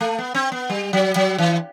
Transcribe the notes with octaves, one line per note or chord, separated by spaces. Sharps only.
A3
B3
C4
B3
G3
F#3
F#3
E3